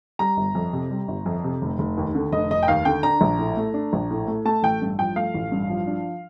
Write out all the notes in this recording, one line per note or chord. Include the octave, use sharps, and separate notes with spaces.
G3 A#5
G1
F2
C3
G3
G1
F2
C3
F1
F1
D#2
D3
F1 D#5
F1 D#5
G5
D#2 F5
D3 G5
D4 A#5
A#1
A2
A3
D4
A#1
A2
A3
A3 A5
A1 G5
G2
F3 G5
A3 F5
A1
G2
F3
D4